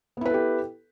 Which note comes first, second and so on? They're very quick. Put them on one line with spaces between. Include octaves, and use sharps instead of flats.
B3 E4 B4 A4 G4